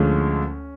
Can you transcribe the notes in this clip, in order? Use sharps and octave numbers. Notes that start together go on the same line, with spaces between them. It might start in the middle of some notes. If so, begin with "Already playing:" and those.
Already playing: D2 D3 F3 G#3 C#4